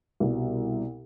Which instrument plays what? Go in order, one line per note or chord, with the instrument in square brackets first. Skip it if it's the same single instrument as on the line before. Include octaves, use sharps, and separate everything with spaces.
[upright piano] C2 B2 G3